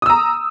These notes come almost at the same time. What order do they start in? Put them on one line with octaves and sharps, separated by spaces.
D#6 E6 A#5